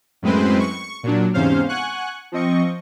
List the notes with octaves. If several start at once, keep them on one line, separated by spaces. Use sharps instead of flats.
F#2 A2 G#3 C4 B4 C5
C#6
A#2 F#3 D4
E2 G#2 C3 C#4 C5 F5
F#5 G#5 C#6 F#6
F3 C4 D#5 C#6